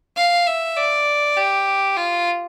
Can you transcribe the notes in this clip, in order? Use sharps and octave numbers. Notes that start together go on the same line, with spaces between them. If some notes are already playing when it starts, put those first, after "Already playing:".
F5
E5
D5
G4
F4